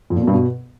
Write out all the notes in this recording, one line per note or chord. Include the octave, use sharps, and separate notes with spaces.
F2
A#2
B2
G2
B2